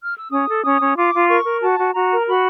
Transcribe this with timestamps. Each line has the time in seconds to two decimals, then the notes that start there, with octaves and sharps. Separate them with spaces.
0.04 F6
0.18 E6
0.30 C#4 D#6
0.47 A4
0.63 C#4 D#6
0.79 C#4
0.96 F4 D6
1.13 F4
1.28 A#4 C#6
1.45 A#4
1.61 F#4 A5
1.77 F#4
1.94 F#4 A#5
2.10 A#4
2.27 F#4 B5